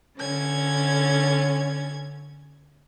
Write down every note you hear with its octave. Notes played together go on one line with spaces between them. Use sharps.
D3 C#4 G#6